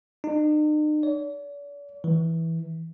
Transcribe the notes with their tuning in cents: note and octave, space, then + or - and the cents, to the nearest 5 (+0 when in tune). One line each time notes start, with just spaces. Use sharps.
D#4 -45
D5 -45
E3 -10